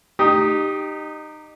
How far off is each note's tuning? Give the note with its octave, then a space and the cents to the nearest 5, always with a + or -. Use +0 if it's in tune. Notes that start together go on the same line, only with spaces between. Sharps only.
D#4 -20 G4 +0 D#6 +10